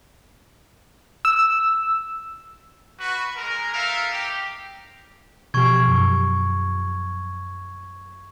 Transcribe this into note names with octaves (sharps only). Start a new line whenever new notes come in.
E6
F#4 B4
G#3 A#4
D#4 A4 A#4 E5 F5
G4
B2 F3 G4 C#6 G#6
F#2